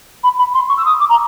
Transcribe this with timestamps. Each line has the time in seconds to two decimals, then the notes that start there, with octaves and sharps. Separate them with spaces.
0.23 B5
0.38 B5
0.53 C6
0.69 C#6
0.77 E6
0.85 D#6
1.00 D6
1.09 A#5